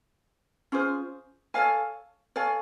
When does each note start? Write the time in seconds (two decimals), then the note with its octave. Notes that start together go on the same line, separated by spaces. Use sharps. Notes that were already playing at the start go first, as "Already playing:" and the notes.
0.72 C#4 F4 G#4 C5
1.54 A4 C#5 F5 G#5
2.36 A4 C#5 F5 G#5